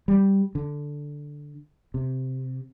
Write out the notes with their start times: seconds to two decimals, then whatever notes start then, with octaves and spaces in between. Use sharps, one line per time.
0.08 G3
0.55 D3
1.94 C3